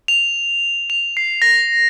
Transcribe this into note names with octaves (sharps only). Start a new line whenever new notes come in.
F7
F7
C7
A#6